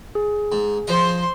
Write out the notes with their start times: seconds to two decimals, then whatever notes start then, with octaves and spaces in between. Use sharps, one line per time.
0.15 G#4
0.52 G#2
0.87 F3 C5 D#5 C6